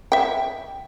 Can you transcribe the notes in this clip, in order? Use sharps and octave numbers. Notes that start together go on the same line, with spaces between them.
E5 G5